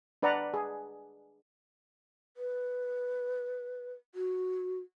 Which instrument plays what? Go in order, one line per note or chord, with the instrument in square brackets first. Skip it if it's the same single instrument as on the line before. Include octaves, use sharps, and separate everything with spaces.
[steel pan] D4 B4 D5 F#5 A#5
G#4
[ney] B4
F#4